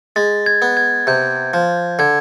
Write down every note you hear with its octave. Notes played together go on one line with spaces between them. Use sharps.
G#3 A6
G#6
B3
G#6
C3 G6
F3
D3 G#6